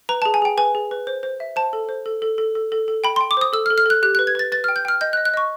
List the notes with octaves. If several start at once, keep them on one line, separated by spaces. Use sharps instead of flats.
B4 A#5
G#4 A5
G#5
G#4 G5
B4 G#5
G#4
B4
C5
C5
E5
C5 A5
A4
C5
A4
A4
A4
A4
A4
A4
G5 B5
G5 C6
D6
C5 D#6
A4 E6
F6
A4
F6
A4 F#6
G4 F#6
B4 F#6
G#6
B4 A6
B4 A6
G5 F6
G6
G5 F6
D#5 G6
F#6
D#5
F#6
D#5 C#6